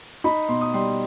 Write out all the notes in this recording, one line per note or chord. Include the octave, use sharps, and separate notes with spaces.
D#4 B5
B2 C6
D#6
G3 C6